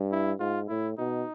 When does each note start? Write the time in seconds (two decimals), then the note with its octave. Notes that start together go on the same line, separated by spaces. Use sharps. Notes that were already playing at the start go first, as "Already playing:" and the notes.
Already playing: G2
0.12 E4
0.40 G#2 F4
0.68 A2 E4
0.98 B2 D#4